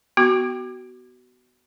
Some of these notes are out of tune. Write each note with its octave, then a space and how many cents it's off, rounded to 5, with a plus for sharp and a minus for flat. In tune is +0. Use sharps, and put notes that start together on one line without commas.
B3 +5 F#4 +25 D6 +30